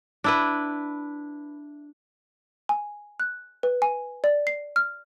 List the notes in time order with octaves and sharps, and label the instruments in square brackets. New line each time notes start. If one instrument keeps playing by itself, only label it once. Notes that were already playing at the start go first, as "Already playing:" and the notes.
[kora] D4 E4 B4
[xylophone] G#5
F#6
B4
G#5
D5
C7
F6